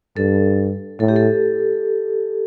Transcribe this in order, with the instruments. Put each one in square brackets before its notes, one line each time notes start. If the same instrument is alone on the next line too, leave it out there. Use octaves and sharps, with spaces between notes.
[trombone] G2 [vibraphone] A4
[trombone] A2 [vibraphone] A4
[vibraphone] G4
A4